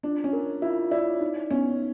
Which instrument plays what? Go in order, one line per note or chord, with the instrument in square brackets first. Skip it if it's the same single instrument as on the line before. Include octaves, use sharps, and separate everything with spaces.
[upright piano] D4 [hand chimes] F4
[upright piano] C#4
[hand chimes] A#4
[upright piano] E4 [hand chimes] F4
[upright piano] E4 [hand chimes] D5
[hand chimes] D#4
[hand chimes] B3 [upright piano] C#4